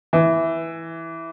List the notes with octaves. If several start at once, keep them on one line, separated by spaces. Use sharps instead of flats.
E3